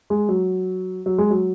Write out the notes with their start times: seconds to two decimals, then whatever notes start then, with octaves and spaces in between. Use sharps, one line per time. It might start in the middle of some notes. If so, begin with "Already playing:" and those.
0.10 G#3
0.29 F#3
1.06 F#3
1.18 G#3
1.31 F#3